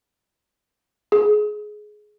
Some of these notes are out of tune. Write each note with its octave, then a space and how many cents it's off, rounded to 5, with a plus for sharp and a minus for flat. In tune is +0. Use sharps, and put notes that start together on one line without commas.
G#4 +20